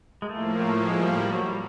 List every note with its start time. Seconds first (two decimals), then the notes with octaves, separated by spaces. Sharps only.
0.22 G#3
0.29 A2 F3 A3 A#3
0.58 A3
0.88 G#3
1.03 G3
1.18 G3
1.33 F#3
1.47 G3